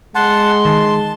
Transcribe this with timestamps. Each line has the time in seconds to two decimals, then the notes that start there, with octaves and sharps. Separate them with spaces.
0.15 G#3 F#5 A5 C6
0.65 D#3 A5